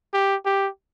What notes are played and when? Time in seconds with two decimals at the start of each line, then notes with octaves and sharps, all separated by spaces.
0.13 G4
0.45 G4